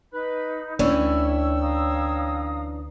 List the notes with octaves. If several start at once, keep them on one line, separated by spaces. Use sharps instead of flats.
D#4 B4 B5
D2 E3 C#4 D4 E4 C#5 G5 E6
F5 A#5 D#6